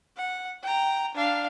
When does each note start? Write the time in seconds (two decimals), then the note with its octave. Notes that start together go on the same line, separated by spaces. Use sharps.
0.17 F#5
0.63 G5 A#5
1.15 D4 F5